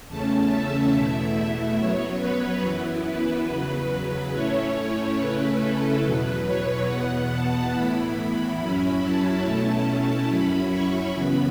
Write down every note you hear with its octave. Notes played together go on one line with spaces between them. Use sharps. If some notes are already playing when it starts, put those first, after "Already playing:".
E2 C#3 A3 C#4 A5
E5
E2 B2 A3 E4
F#2 F#3 B3 C#5
B4
F#2 E3 B3 E4
B4
E2 C#3 F#3 B4
A2 A3 C#4 E4 C#5
C#3 A3 C#4 E4 B4
A4
E2 B2 F#3 B4
C#5
E2 B2 B3 F#5
A5
A2 E3 B3 E4 B5
B5
F#2 F#3 C#4 E4 B5
A5
B2 A3 C#4 E4
A5
F#2 F#3 C#4 E4 B5
C#6
F#2 C#3 E3 B3 B5